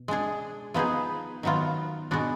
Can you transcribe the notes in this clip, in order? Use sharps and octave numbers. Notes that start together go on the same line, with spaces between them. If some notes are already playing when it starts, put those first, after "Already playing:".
Already playing: B2
G#3 D4 G#4
F3 B3 D#4 G#4 B4
D#3 F#3 B3 F4
B2 G#3 B3 D4 F#4